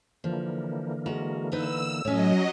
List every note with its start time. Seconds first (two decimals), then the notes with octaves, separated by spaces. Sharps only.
0.24 D3 E3 F3 A#3
1.06 G#3 F#4 A#5
1.52 B3 D#4 B4 E6
2.05 A2 F#3 A3 C#4 C#5 D#5